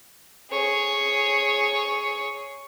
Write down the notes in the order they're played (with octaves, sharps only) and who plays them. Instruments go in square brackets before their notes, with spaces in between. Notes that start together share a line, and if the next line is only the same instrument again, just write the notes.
[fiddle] G#4 C#5